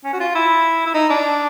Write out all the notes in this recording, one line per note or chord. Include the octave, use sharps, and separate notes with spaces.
C#4
F#4
F4
E4
E4
D#4
D4